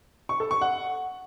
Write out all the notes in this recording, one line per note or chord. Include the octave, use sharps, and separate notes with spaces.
C#6
A4
C#6
F#5